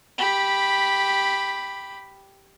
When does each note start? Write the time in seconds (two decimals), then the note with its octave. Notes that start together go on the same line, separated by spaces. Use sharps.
0.18 G4 B5